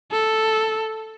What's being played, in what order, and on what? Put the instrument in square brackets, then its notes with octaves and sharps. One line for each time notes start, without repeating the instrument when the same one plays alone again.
[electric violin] A4